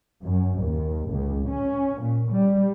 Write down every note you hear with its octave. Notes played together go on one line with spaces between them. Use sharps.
F#2
D#2
C#2
C#4
A#2
G3